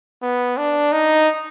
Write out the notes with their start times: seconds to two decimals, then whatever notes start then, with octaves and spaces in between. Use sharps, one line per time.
0.22 B3
0.57 D4
0.92 D#4